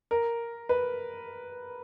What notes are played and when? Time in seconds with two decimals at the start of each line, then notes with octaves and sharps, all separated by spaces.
0.11 A#4
0.69 B4